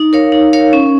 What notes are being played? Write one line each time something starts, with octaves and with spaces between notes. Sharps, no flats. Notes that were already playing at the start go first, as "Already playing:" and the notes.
Already playing: D#4
A#4 C#5 F5
D#4
A#4 C#5 F5
C#4